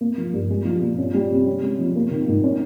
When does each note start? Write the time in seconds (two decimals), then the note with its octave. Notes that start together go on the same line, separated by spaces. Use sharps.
0.01 A#3
0.18 F3
0.33 G2
0.50 G#3
0.65 F3
0.81 A#2
0.98 C#4
1.14 G3
1.30 C3
1.46 C#4
1.63 G#3
1.79 F3
1.96 A#3
2.11 D#3
2.28 G#2
2.44 C#4